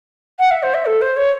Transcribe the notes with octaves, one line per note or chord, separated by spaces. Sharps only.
F#5
E5
C5
E5
A4
C5
C#5